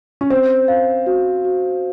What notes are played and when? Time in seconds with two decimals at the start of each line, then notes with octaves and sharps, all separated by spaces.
0.21 C#4
0.30 C4 C5
0.68 F5
1.06 F#4
1.44 F#4